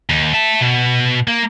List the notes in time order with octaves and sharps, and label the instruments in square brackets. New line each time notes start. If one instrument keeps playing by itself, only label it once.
[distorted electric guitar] D#2
E5 A5
B2
A#3